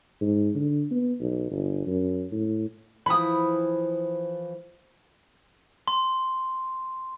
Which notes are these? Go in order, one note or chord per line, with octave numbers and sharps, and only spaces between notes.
G#2
D3
B3
B1
G1
F#2
A2
E3 F3 B5 D#6
C6